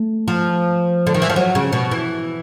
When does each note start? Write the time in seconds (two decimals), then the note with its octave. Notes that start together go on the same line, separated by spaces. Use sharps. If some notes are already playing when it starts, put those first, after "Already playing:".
Already playing: A3
0.28 F3
1.07 D3
1.14 D#3
1.22 E3
1.30 F3
1.36 F#3
1.55 C#3
1.73 B2
1.91 E3